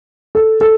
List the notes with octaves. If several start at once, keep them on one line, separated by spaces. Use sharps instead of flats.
A4
A4